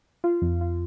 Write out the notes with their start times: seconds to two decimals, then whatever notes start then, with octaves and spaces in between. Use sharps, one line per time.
0.24 F4
0.42 F2
0.61 F4